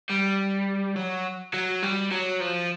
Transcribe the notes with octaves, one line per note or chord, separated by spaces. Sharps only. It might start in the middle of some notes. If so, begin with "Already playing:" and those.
G3
F#3
F#3
G3
F#3
F3